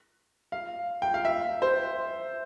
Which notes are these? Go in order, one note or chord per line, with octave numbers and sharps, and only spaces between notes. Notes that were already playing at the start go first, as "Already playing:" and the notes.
F5
G5
F5
E5
C5